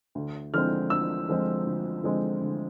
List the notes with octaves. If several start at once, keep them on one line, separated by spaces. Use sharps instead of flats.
D2
D3 F3 G#3 C4 F6
D2 E6
D3 F3 G#3 C4
D2
D3 F3 G#3 C4
D2